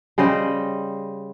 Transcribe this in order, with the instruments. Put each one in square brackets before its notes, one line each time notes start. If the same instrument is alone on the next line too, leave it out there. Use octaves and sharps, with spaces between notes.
[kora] C#3 G3 C5 D#5